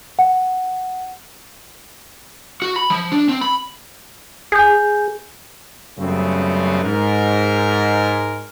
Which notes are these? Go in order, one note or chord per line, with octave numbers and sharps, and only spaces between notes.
F#5
F#4
B5
F3
D4
C4
B5
G#4 G#5 G6
F#2 C#3 G3 A3 B3 C4
G#2 A#4